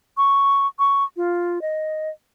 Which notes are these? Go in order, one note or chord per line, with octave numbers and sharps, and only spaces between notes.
C#6
C#6
F4
D#5